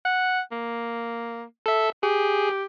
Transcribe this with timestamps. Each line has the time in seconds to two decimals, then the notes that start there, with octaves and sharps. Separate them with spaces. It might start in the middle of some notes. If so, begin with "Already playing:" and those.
0.05 F#5
0.52 A#3
1.66 A4 E5
2.03 G4 G#4